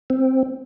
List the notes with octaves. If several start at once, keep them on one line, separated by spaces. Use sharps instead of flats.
C4